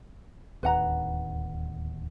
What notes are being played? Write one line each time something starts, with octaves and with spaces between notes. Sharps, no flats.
D1 D#2 B4 F#5 A#5